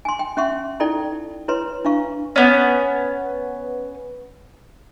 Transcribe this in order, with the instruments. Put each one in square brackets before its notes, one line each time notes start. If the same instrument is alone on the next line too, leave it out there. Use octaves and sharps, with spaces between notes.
[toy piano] G#5 C6
G5
C#4 E5 F#5 C6 C#6
D#4 E4 A4 D5 G5
E4 B4 C#5 C6
D4 E4 F5 C#6
[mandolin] B3 C#4